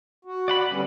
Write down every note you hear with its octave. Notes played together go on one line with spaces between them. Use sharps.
F#4
D5 F#5 B5
D3 G3 B3 C#4